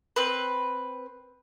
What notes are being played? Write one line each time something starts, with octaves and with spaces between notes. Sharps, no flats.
C4 B4